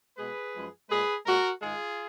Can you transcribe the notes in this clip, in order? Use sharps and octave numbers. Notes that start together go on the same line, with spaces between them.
B2 G#3 G#4 B4
F#2 F3 G#3
A#2 G#3 G#4 B4
A#2 G#3 F#4 A#4
G#2 D#3 G#3 F4 G#4